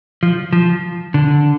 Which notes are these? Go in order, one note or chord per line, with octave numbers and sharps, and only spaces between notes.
F3
F3
D3